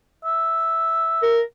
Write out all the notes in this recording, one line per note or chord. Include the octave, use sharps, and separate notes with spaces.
E5
A#4